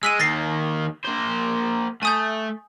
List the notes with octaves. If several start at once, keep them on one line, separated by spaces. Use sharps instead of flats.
G#3 E6 B6 D#7
D#2 D#3 A6 A#6 C7
A#3 C5
A3 G#5 D#6 G6